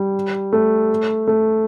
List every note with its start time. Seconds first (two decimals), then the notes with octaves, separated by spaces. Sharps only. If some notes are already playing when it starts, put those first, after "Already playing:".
Already playing: G3
0.53 A3
1.27 A3